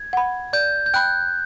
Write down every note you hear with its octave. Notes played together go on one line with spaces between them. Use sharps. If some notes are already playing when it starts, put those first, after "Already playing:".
Already playing: G#6
F#5 B5
D5 G6
G6
G5 B5 F#6